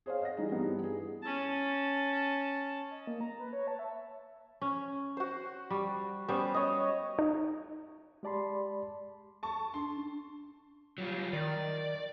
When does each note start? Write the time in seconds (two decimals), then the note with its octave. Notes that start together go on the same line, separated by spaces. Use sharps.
0.06 G#4 C5 C#5 F5
0.21 D#5 F#5 A#6
0.37 E3 G3 D#4 G#4
0.52 G2 E3 G3 B3
0.83 G#4
1.23 C#4 A5
2.91 D#5
3.07 A#3
3.21 A#5
3.40 B4
3.53 C#5
3.68 A5
3.79 E5
4.62 C#4
5.17 F#4 C5
5.70 G3
6.29 G3 B3 C#4 C5
6.54 C#5 D#5
7.19 D#4
8.23 G#3 G4 D5 A5 B5 C6
9.43 A5 C#6
9.74 D4 C6
10.98 F#3 G3 F4
11.33 D#3 D5